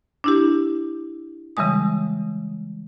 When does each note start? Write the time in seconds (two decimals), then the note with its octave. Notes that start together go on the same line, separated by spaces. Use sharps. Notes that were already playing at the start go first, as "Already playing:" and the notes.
0.24 D4 E4 G4
1.57 C#3 E3 G3 G#3 D#6